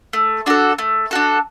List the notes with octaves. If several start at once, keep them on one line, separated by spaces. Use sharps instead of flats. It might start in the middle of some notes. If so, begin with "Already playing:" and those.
A3
D4 F#4 A4
A3
D4 F#4 A4